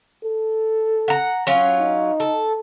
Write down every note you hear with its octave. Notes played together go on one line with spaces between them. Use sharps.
A4
F#5 A#5
F#3 C#4 F4
D#4
A4